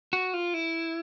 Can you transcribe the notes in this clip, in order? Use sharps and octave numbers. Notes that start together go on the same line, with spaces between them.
F#4
F4
E4